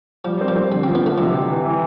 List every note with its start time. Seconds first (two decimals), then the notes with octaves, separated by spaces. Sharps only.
0.25 F3 G3
0.41 C4
0.48 F3
0.56 C4
0.72 D3 G3
0.83 C4
0.88 F3
0.95 B3
1.02 D3 A3
1.18 C3 F3
1.34 C3
1.49 E3
1.65 E3